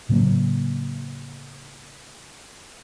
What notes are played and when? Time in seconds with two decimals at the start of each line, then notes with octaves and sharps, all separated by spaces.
0.09 A2 C#3 F#3 A#3